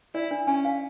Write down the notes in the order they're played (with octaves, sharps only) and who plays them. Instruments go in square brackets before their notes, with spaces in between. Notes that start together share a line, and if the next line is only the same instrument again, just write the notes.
[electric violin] E4 [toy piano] D5
[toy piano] D4
[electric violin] C#4 [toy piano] G#5
[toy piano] F5